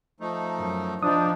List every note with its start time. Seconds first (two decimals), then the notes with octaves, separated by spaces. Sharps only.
0.20 F3 A3 D#4
0.57 F#2
1.03 F3 D4 D#4 D#6